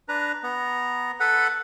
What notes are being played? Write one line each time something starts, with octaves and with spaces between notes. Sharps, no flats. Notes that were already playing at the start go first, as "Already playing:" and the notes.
D4 B4 A#5
B3 A#5
A4 B4 F#5 B5